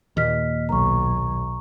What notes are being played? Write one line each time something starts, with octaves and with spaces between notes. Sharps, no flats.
D#2 A#2 D#5 F6 B6
B1 A#5 C#6